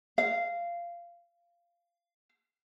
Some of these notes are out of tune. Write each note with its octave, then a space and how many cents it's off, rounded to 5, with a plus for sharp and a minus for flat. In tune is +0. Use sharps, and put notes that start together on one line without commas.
F5 -15